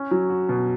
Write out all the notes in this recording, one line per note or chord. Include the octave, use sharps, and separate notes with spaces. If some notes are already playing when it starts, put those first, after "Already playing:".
Already playing: C#4
F#3
F#4
B2